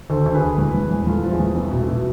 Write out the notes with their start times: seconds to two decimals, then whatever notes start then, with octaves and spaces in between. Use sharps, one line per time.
0.10 D2 A4 C5
0.26 D2
0.34 G#4 B4
0.42 D2
0.58 E2
0.74 E2
0.91 E2
1.07 E2 F4 A4
1.23 F3
1.31 E4 G#4
1.40 E2
1.55 C2 B3
1.71 B2
1.79 A3
1.88 B2